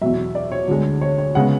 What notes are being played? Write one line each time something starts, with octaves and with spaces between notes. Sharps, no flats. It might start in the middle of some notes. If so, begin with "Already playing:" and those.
E2 B2 F#3 E5
D5
C#5
D2 D3 G#3
C#5
C#5
C#3 G#3 B3 F#5